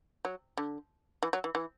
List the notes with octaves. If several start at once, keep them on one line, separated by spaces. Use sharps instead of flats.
F#3
D3
E3
F#3
E3
E3